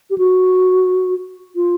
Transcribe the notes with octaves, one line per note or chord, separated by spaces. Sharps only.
G4
F#4
F4